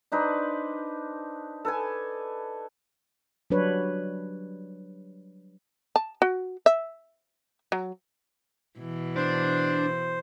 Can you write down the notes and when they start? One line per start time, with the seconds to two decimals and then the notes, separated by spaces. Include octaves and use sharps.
0.12 D4 D#4 B4 C5
1.65 A4 B4 G#5
3.50 F#3 G3 D4 B4 C#5
5.96 A5
6.22 F#4
6.66 E5
7.72 F#3
8.79 B2 E3
9.16 D4 C5